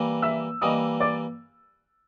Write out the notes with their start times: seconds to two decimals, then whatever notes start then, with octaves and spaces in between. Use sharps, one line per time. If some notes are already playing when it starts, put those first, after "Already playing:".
Already playing: E3 G3 A#3
0.22 E5 E6
0.61 E3 G3 A#3 D#5 D#6
1.00 D5 D6